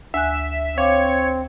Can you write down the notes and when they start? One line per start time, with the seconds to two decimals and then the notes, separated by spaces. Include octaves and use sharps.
0.14 D2 E5 G#5 F#6
0.78 C4 C#5 F5 D6